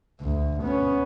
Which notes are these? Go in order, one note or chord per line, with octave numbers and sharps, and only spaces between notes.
D2
B3 C#4